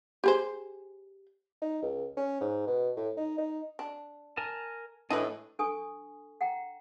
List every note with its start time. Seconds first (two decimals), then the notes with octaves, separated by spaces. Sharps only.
0.24 G4 G#4 C5
1.62 D#4
1.82 C#2
2.17 C#4
2.41 G#2
2.67 B2
2.97 A2
3.17 D#4
3.38 D#4
3.79 D4
4.37 A#4 G#5 A5
5.10 A2 E3 G#3 D4 B4 D#5 G#5
5.59 D4 A4 G#5 C#6 D#6
6.41 F#5 G5 A#5